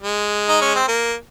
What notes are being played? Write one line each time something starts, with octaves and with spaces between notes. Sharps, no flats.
G#3
D#4
C#4
C4
A#3